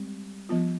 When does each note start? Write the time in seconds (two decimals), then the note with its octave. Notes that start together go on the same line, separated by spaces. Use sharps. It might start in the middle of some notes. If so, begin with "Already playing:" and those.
Already playing: G3 G#3 C4
0.49 F3 B3 F4